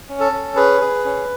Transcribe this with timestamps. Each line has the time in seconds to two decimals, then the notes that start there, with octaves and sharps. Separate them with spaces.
0.09 C#4
0.20 A4
0.32 C#4
0.56 G#4 B4
0.81 G#4
1.05 C#4